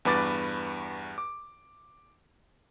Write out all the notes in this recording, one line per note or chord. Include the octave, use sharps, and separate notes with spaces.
E2 G2 B4 D6 A6
D6